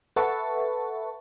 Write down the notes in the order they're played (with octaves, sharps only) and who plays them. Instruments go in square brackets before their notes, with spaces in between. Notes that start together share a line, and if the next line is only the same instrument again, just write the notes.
[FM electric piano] A4 B4 E5 F#5 A5 C#6